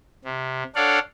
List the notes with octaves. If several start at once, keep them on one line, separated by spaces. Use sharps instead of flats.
C3
D4 A4 C#5 D5 F5 F#5